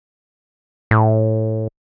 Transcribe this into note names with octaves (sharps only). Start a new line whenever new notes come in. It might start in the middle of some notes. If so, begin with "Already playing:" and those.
A2